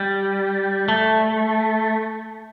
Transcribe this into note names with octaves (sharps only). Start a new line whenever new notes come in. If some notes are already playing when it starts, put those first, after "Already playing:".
Already playing: G3
A3